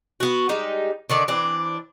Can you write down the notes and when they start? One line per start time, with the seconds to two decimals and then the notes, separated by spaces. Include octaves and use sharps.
0.20 B3 F#4
0.49 G3 G#3 D#4
1.10 D3 D#3 D5
1.28 E3 C4 D4 D5